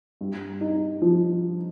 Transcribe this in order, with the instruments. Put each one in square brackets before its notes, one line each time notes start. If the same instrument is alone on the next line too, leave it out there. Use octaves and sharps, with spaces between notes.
[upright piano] G2
D#4
F3